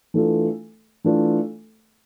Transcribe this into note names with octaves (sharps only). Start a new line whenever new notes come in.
E3 A3 D4 F4 A4
E3 A3 D4 F4 A4